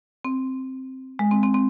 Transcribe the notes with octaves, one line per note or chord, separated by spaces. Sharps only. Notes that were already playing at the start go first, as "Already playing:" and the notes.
C4
G#3
C4
C4
C4